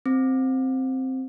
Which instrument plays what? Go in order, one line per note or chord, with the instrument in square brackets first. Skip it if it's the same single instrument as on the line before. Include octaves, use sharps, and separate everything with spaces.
[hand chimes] C4